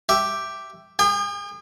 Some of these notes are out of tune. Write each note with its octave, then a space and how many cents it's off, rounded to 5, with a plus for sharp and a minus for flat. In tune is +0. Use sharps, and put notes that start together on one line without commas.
G4 +0 E5 +0
G#4 -35 G5 +35